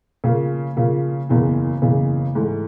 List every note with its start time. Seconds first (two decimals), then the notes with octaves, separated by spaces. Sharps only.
0.24 C#3 F3 A#3
0.77 C#3 F3 A#3
1.29 F#1 E2 C#3 E3
1.82 F#1 E2 C#3 E3
2.35 G#2 E3 A3